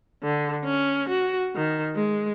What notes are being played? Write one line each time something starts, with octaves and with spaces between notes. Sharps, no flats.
D3
C#4
F#4
D#3
G#3